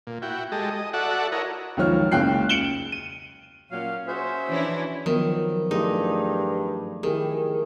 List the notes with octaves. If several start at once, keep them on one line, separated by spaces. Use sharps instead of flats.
A#2
E4 F#4 G5
G#3 G4 A4 D#5
D#5
F#4 A4 D5 E5 F#5
E4 A#4 C#5 D#5
C#2 F#2 D#3 F3 C#5 F6
F#1 C#2 C#3 G5 F#6 C7
C#7 D7 E7 F#7 G7
D#7
A#2 F#3 C#4 F5
F#4 G#4 C5 E5
E3 C#4 D4 E4
D#3 F3 F#3 B3
G2 A3 D#4 E4 G#4
D#3 E4 G4 G#4